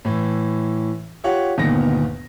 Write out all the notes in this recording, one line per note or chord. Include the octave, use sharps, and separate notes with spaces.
A2 E3
F4 G4 C#5 F#5
G1 D2 A#2 D#3 B3 A#6